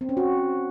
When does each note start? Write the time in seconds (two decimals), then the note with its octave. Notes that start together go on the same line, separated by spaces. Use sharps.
0.01 C4
0.09 C#4
0.17 F#4